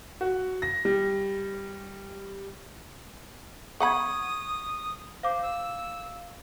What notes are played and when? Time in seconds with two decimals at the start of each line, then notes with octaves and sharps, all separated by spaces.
0.21 F#4
0.62 A#6
0.85 G3
3.80 B3 F#5 B5 C#6 D#6 G#6
5.23 C5 F5 D6
5.42 E6